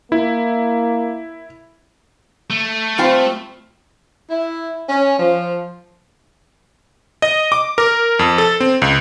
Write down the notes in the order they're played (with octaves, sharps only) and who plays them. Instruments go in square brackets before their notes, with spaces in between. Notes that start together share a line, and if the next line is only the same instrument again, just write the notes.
[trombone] A#3 [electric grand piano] E4
[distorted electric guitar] A3
[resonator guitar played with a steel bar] G3 F4 G5 [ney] C4
[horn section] E4
C#4
F3
[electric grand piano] D#5
D6
A#4
F2
A4
C4
C#2